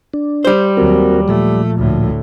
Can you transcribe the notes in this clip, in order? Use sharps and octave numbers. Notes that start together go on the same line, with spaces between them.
D4
G3 C5
D#2 F#3 C4 F#4 A#4
A#2 F3 A3
D2 A2